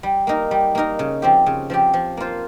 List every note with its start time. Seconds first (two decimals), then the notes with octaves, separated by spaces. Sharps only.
0.03 G3
0.27 A#3 D#4 A#4
0.51 G3
0.75 A#3 D#4 A#4
0.99 C#3
1.22 F3 C4 G4
1.46 C#3
1.70 F3 C4 G4
1.94 F3
2.17 A#3 F4 C5